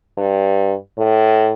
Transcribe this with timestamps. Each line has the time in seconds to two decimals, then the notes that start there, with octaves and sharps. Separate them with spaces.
0.18 G2
0.98 A2